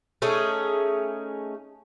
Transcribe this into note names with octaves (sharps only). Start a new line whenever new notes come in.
A3 C#4 D#4 G#4